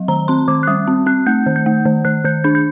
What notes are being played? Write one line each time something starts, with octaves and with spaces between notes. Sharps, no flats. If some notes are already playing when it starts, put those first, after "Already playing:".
Already playing: F#3
D#3 A#5
C4 C6
D#3 D6
F#6
G3 D#6
C4
C4 F#6
A3 G6
D#3
G6
A3
D#3
D#3 F#6
D#3 G6
D4 G6
G6